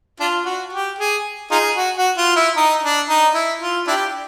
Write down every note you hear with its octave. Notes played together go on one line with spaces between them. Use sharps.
D4 F4
F#4
G4
G#4
D#4 F4 G#4
F#4
F#4
F4
E4
D#4
D4
D#4
E4
F4
D4 E4 G4